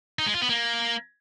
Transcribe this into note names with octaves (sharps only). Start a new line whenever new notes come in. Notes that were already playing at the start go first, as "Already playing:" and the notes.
D#4
G#3
F4
B3
A#3